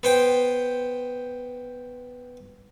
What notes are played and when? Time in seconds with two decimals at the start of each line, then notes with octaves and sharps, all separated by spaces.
0.03 B3 C5 G5